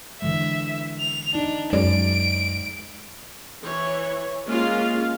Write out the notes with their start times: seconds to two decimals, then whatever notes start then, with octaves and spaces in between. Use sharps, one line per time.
0.22 D3 E3 G#3 E5
1.00 F7
1.35 D4 D#4
1.73 F#2 G#3 G#4 D5 D7
3.65 E3 C#5
4.47 G#3 A#3 C#4 F4 F5